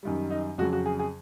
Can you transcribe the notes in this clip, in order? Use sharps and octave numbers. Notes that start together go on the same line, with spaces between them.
F#2 D#3 G3
D#4
F2 C#3 F#3 F#4
F#4
G#4
G#4